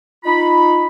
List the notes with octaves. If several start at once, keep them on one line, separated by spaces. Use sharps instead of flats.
D#4 F4 B5